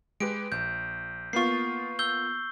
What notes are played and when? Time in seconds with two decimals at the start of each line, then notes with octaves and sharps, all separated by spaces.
0.20 G#3 G4 B4 D7
0.52 A#1 G6
1.33 A#3 B3 F4 C#6 C7
1.99 E6 G6 G7